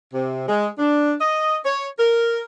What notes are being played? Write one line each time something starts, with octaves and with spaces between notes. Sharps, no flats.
C3
G#3
D4
D#5
C#5
A#4